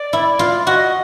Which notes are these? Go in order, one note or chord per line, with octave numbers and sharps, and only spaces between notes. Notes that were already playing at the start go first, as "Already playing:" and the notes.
Already playing: D5
E4
F4
F#4 D#5